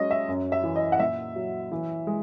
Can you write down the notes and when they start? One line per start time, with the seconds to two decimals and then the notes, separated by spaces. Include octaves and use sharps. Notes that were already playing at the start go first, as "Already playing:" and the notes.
Already playing: F#3 G#3 C#4 D#5
0.11 E5
0.28 F#2
0.52 E5
0.63 E3
0.76 D#5
0.92 F#5
0.99 A#2 E5
1.35 F#3
1.72 E3
2.07 G#3